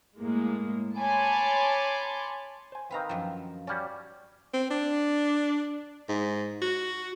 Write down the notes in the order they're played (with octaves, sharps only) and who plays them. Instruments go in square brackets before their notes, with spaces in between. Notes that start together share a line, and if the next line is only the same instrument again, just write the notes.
[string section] A2 G#3 A#3
C#5 G#5 A5 B5 C6 D6
[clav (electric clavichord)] C5 G#5
[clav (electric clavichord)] D#3 C4 [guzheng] B4 F5 A#5
[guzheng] F#2 F3
[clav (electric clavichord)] G3 C#4 [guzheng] F#4 D5
[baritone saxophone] C4
D4
G#2
F#4